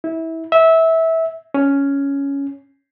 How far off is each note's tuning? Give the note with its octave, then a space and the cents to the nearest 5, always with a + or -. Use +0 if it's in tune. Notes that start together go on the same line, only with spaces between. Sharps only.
E4 -25
E5 -20
C#4 +5